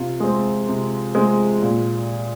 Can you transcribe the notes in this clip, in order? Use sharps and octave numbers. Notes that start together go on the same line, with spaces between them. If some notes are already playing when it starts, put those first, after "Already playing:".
Already playing: C3 F4
G#3 C4
C3
G#3 C4
A#2